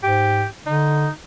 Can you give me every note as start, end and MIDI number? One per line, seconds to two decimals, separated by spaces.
0.03 0.44 44
0.03 0.45 67
0.66 1.08 50
0.66 1.10 63